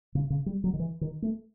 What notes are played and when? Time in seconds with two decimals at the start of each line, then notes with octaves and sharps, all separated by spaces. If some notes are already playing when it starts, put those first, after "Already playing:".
0.15 C#3
0.30 C#3
0.46 G3
0.64 F#3
0.74 D#3
0.79 E3
1.01 D#3
1.22 A3